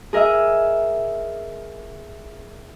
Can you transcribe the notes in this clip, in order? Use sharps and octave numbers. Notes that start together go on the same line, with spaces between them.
G#4 A#4 D#5 E5